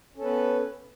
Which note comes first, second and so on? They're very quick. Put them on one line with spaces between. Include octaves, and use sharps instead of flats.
C#4 A4 B3 B4